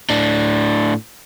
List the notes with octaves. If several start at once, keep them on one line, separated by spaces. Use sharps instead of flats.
A2 D4